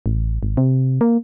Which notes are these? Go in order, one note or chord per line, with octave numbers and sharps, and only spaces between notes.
A1
G#1
C3
A#3